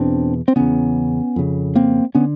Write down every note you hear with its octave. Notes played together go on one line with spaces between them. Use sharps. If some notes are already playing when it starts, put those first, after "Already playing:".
Already playing: E2 B2 C4 D4
C4
E2 C#3 B3 C#4
F2 C#3
A#3 C4
D3 B3 C#4